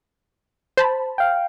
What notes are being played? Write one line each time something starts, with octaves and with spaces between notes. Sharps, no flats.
C5 A5 B5
F5 G5